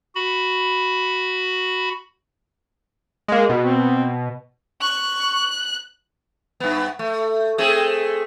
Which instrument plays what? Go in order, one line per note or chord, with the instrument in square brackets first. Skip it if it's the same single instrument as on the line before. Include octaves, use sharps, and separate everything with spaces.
[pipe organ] F#4 B5
[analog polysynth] G#3 A#3
B2
[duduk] C4
[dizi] C#6 [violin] F#6
[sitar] G2 B3
A3
A3 C4 G#4